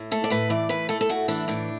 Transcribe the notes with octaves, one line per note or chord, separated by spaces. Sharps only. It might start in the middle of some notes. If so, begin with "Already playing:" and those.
Already playing: A2
A3 A4
D5
A2 B4
E3 D5
A2 B4
A3 A4
A4
A2 F#4
E3 D4
A2 D4